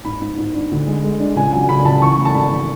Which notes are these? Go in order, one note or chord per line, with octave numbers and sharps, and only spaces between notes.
G#2 B5
G#2
G#2
D4
D2
G#3
G#3
D4
C#2 G#5
F#3 G#5
C#3 B5
C#2 A5
E3 C#6
A3
A5
G#1 B5
E3